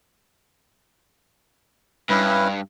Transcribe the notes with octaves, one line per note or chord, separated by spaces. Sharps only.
G2 C#4 E4 B4